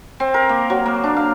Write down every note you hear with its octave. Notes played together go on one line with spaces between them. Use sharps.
C4
A#4
A#3
F#3
A#3
D4
F5